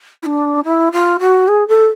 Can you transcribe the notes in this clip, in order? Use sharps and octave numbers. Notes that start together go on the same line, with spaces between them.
E4
D4
E4
F4
F#4
G#4
A4